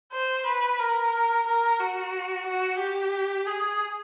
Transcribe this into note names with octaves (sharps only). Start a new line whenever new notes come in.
C5
B4
A#4
A#4
F#4
F#4
G4
G#4